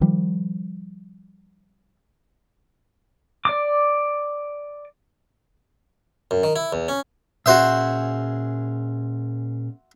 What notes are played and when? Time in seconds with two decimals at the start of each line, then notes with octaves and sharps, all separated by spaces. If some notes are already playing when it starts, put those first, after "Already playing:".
0.01 D#3 F3 G3
3.45 D5 D6
6.31 F#2
6.44 D#3
6.56 E4
6.73 E2
6.89 C#4
7.46 A#2 C#4 F#4 G#4 C5 E5